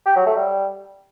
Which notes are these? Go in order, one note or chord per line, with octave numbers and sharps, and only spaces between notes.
G4
F#3
A3
G3